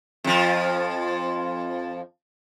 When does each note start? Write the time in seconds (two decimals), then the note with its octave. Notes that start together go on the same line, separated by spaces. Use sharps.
0.24 F2 F3